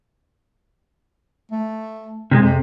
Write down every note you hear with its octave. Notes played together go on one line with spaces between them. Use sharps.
A3
C3 F#3 G#3
F2 C3